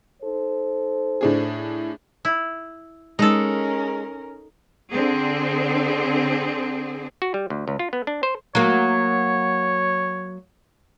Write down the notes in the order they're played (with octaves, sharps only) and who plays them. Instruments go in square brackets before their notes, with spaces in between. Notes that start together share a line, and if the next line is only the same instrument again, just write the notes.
[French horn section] D#4 A4 C5
[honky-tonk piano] A2 D4 G#4
[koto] E4
[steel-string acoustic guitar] G#3 [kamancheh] C#4 A#4 [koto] D#4 A4
[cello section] D3 C4 G#4
[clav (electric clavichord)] F#4
G3
D2
C#2
F4
B3
D4
C5
[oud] F#3 A#3 [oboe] C#5